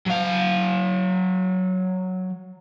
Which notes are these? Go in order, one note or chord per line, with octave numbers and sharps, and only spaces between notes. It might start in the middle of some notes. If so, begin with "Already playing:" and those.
F#3 F5